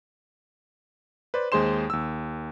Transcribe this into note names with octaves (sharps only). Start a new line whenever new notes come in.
B4 C5 D5
D#2 G#3 G#4 C5 C6 E7
D#2 E6